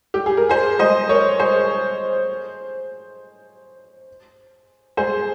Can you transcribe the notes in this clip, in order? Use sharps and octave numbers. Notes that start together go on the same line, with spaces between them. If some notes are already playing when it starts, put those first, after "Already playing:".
G4
G#4
A#4
G#4 C5
C5 D#5
A#4 C#5
G#4 C5
G#4 C5